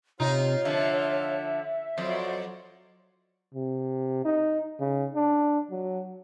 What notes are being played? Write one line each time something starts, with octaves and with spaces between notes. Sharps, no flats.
C3 D#4 F4 C#5
D3 F3 E5
F2 F#3 C5 D5
C3
D#4
C#3
D4
F#3